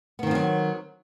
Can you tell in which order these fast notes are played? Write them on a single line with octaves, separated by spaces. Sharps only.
B3 D#3 C4 F3 F#3